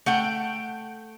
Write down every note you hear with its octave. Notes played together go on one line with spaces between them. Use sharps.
A3 F#5 G5